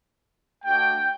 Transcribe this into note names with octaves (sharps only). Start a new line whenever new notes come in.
A3 D4 F#4 G5